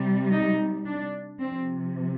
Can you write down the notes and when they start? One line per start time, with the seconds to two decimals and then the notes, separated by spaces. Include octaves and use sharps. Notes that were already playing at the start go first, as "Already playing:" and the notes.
Already playing: C3 G3
0.31 D#4
0.85 D4
1.39 C3 F3 C4